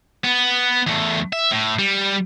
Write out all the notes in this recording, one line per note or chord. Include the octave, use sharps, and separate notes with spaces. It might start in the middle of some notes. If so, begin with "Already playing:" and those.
B3
E2 A3
E5
A2
G3